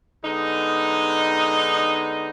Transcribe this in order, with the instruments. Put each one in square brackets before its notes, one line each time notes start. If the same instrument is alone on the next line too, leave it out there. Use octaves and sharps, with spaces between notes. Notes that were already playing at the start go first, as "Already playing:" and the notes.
[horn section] D3 G#3 B3 D#4